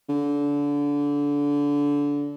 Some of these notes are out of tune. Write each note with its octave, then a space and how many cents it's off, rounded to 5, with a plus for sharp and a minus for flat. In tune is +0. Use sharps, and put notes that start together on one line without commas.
D3 -25